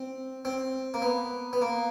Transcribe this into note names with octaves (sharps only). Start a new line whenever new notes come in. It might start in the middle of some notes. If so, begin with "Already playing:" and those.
Already playing: C4
C4
A#3
B3
B3
A#3